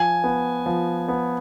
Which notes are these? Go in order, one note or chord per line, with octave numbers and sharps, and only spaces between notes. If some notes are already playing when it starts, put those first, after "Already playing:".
Already playing: F3 G#5
B3
F3
B3